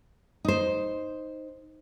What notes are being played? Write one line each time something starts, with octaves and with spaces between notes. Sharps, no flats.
D#4 C5